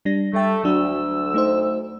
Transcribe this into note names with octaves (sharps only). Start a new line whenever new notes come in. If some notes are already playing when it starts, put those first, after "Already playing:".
G3 D4 A#6
G3 A3 G5
D2 F#3 D4 F#4 E6
A3 D#4 C5